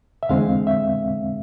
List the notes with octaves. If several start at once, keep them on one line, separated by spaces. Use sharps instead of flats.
E5
E2 D3 G#3 C4 F5
E5